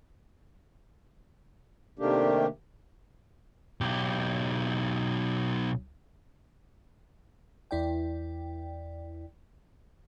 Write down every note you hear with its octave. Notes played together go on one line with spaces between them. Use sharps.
C3 D#3 A3 A#3 D4 G4
B1 G4
E2 E4 D5 G5